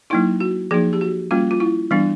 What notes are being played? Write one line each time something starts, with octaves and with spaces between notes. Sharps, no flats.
F#3 A#3 D#4 E4
F#4
F3 A#3 D#4 G#4
G4
F#4
G3 A#3 C#4 F4
F4
E4
E3 G3 B3 D4